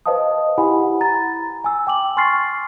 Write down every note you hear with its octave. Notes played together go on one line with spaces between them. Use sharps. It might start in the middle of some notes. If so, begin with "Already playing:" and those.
B4 C5 D#5 F5 A5 D#6
E4 G4 F#5 G#5 B5
A#5 A6
G#5 E6
G5 D6 F#7
G#5 C6 C#6 F6 A6 C7